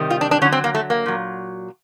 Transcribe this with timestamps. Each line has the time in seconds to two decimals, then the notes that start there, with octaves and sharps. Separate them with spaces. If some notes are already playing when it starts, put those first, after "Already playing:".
Already playing: C3 D#3 G3
0.10 F4
0.21 D4
0.31 D4
0.42 D3 C#4
0.44 F#3
0.52 C4
0.64 A#3
0.75 A3
0.90 A#3
1.06 A#2 F#3